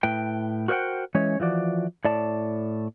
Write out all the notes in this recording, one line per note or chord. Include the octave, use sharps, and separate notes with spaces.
A2 B4 G5
F#4 A#4 C5 D#5 F#5 G5
E3 G#3 C#4 C#5
E3 F3 F#4 D5
A2 D5 A5